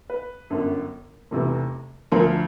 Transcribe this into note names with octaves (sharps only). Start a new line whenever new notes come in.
B4
G1 F#2 D3
F1 E2 C3 E3
D2 D3 F3 A#4